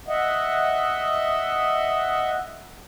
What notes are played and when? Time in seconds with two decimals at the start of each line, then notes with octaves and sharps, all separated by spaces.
0.08 D#5 E5 F#5